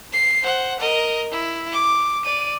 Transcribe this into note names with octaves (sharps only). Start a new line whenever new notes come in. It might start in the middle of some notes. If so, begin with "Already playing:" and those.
C7
C5 F#5
A#4 D#5
E4
D6
D5 D#7